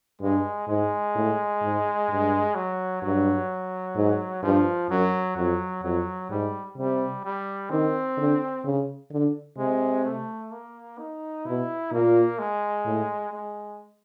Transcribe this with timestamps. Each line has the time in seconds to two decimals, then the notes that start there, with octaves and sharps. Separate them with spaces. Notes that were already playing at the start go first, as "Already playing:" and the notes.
0.21 G2 G#3
0.68 G#2 G#3
1.15 A2
1.62 G#2
2.08 G2
2.55 F#3
3.02 G2 F#3
3.96 G#2
4.43 G2 F3
4.89 F#2 F#3
5.36 F2 F#3
5.83 F2 F#3
6.30 G#2 G3
6.77 C3 G3
7.24 G3
7.70 D#3 C4
8.17 D3
8.64 C#3
9.11 D3
9.58 C3 G#3
10.04 A3
10.52 A#3
10.98 D#4
11.46 B2 E4
11.92 A#2 A#3
12.39 G#3
12.86 A2
13.33 G#3